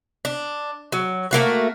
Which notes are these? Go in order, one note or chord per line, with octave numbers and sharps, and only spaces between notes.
D4
F#3
A3 A#3 F4 F#4